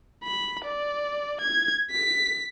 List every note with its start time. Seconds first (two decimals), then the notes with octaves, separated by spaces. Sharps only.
0.23 B5
0.64 D5
1.41 G#6
1.91 B6